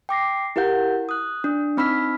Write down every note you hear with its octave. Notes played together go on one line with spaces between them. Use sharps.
G5 D6 A#6 C7
E4 G4 A#4 F5 F#5 G6
D#6 F#6
D4
C4 D#4 B5 E6 F6 B6